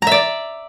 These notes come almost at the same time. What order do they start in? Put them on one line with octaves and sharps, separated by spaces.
A#5 E5 D5